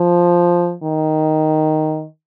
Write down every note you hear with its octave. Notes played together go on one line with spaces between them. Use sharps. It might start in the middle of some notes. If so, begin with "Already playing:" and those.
Already playing: F3
D#3